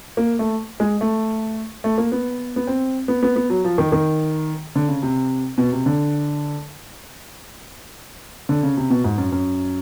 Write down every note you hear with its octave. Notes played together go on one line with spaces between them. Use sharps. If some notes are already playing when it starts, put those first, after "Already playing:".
A#3
A3
G#3
A3
A3
A#3
B3
B3
C4
B3
B3
B3
F#3
F3
D#3
D#3
D3
C#3
C3
B2
C3
D3
D3
C#3
C3
B2
G#2
F#2
F#2